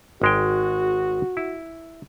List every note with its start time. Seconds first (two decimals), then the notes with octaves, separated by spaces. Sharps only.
0.22 G#1 G#3 F#4 G5
1.37 E4